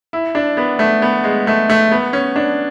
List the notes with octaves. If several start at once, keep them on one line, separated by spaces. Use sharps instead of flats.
E4
D4
B3
A3
B3
G#3
A3
A3
B3
C#4
D4